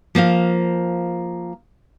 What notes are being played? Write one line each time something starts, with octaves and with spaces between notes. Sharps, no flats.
F3 A#3 C5 F5